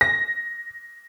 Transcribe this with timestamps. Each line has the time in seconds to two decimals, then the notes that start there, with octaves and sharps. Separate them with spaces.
0.01 A#6